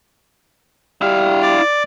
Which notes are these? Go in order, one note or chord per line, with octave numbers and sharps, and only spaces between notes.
G3 E4 F5
D5